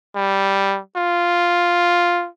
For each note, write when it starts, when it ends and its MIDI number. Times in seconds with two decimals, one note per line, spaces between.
0.15 0.80 55
0.96 2.28 65